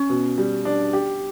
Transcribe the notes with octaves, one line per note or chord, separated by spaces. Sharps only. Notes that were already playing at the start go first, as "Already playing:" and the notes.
Already playing: C#4
B2
G3
D4
G4